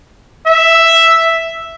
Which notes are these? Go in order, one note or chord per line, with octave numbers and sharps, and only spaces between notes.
E5